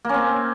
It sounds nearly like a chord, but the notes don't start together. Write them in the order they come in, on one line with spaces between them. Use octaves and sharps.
A#3 C#4 C4